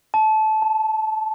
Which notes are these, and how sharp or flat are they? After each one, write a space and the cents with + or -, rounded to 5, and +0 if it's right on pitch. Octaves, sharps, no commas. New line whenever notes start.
A5 -20
A5 +25